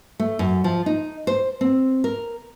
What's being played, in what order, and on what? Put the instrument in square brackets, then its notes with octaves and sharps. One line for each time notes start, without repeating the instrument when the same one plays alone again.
[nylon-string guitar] A3
F#2
F3
D#4
C5
C4
A#4